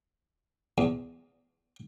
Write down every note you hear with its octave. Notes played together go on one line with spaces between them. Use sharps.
E2